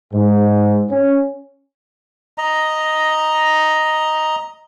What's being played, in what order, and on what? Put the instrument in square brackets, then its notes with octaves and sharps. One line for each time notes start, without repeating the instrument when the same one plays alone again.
[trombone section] G#2
C#4
[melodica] D#5 A#5